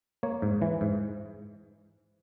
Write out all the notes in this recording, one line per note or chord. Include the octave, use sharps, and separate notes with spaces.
A#3 C#5
G#2
E3
G#2